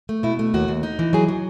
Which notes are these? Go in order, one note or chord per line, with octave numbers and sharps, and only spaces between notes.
A3
B2 E4
A3
D#2 F#4
D#2
D#4
E3
F#3 G#4
F#3